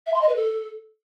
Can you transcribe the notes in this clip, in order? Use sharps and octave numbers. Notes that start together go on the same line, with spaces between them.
E5
C6
D#5
B4
A4